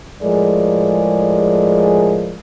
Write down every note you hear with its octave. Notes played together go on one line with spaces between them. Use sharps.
A2 F3 G#3 G#4 A#4 D5